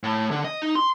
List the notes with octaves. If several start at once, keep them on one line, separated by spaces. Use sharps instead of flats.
A2
D3
D#5
D#4
C6